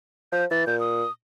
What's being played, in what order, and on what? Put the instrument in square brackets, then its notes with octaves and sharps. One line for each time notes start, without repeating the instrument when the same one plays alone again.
[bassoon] F3 [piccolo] G6
[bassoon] E3 [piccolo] A6
[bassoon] A#2 [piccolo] G6
[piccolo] D#6